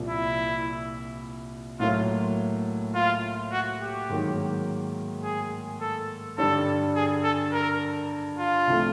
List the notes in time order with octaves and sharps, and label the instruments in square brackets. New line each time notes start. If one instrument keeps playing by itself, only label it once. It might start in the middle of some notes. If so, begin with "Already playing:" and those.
Already playing: [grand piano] C2 A#2 F3
[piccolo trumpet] E4
[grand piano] A2 F#3 A#3 [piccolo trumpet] F4
[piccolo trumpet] F4
F#4
G4
[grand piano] G#2 D#3 F#3 A#3
[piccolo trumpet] G#4
A4
[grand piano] G2 D3 G3 [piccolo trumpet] A4
[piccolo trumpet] G#4
A4
A#4
F4
[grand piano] C2 C3 F3 A3